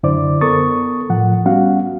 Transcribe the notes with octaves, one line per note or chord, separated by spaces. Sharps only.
F#2 D3 E4 C5 D5 D6
B3 A4 A#4 C#6 D#6 A6
A2 F3 F#5
G3 B3 C#4 F#4 F5 F#5